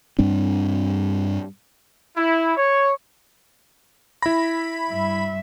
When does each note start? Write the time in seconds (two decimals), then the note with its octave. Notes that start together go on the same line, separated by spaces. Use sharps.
0.19 G2 G3 C4 D4
2.16 E4
2.57 C#5
4.22 E4 B5 A#6
4.90 G2 E5